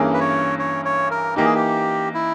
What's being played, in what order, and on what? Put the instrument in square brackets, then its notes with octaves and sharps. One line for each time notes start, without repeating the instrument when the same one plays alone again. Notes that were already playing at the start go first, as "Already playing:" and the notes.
Already playing: [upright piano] G2 E3 A#3 C#4 G#4
[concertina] B4
C#5
C#5
C#5
A#4
[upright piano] E3 A#3 D#4 [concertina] G4
[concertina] G#4
G4
E4